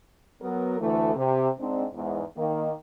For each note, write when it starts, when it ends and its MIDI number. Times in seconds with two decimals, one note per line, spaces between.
0.42 0.79 54
0.42 0.79 59
0.42 0.79 70
0.80 1.14 38
0.80 1.14 52
0.80 1.14 57
1.16 1.48 48
1.59 1.85 44
1.59 1.85 60
1.59 1.85 62
1.93 2.22 40
1.93 2.22 44
2.36 2.69 51
2.36 2.69 58